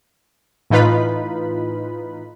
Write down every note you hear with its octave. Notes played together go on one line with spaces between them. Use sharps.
A2 E3 D#4 F4 B4 B5